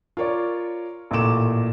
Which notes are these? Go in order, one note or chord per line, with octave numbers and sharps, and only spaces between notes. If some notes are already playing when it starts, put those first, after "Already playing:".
F4 A#4 C#5 D5
A1 A#2 A3 D6 E7